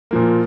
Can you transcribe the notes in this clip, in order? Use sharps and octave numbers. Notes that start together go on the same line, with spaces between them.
A#2 F3 A#3